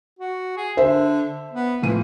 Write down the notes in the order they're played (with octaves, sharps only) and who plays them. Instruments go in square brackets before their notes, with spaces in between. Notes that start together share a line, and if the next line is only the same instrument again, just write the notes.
[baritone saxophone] F#4
G#4
[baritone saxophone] D3 [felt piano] C5 E5
[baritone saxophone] B3
[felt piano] A2 F3 D#7 [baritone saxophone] E3